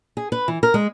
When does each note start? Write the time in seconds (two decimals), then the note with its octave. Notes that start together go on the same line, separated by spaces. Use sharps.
0.17 G#4
0.32 B4
0.48 E3
0.63 A#4
0.74 G#3